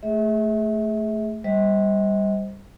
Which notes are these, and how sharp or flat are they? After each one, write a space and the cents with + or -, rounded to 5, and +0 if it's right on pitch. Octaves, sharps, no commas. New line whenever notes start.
A3 +0 G#4 +0 E5 -30
G3 +10 C5 +0 D#5 +40